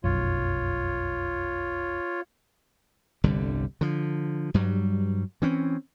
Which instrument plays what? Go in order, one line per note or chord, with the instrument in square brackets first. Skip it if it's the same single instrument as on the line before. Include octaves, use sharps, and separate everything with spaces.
[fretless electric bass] F1 B1 F#2 [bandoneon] F4 C#5
[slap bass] G1 C2 D3 G3
D3 F3
G2 F#3 G3
E3 C4 C#4